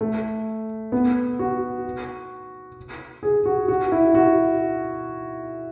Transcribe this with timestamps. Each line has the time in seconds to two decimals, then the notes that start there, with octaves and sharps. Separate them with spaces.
0.01 A3
0.92 B3
1.39 F#4
3.23 G#4
3.45 F#4
3.68 F#4
3.92 E4
4.15 F#4